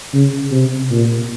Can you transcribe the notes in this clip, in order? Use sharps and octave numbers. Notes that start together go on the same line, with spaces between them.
C#3
C3
A#2